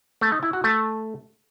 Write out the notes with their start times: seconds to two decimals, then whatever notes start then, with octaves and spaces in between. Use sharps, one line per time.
0.21 A3
0.32 D#4
0.43 E4
0.53 F#4
0.64 A3